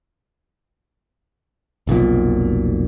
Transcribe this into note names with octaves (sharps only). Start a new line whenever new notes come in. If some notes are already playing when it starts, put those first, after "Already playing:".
F1 B1 F2 A#2